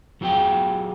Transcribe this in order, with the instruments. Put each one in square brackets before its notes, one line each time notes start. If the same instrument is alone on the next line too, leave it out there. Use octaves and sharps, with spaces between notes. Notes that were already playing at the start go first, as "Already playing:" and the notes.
[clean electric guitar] F#3 F4 G4 G#4 G5